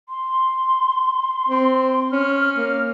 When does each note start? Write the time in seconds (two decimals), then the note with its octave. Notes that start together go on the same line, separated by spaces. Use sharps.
0.09 C6
1.49 C4
2.12 C#4 F6
2.57 A#3